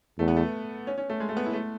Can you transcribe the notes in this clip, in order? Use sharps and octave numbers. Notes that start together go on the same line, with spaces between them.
E2 A3
B3
A3
C#4
C#4
A3
G#3
A3
B3
E4
A3